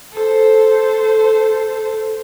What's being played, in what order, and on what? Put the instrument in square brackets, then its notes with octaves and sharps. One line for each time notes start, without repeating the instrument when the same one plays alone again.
[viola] A4 C5